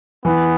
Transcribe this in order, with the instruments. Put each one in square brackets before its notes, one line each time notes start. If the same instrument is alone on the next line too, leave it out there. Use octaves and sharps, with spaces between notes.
[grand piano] E3 [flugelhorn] B3